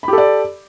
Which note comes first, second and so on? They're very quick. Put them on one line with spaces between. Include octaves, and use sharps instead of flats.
B5 G4 A4 D5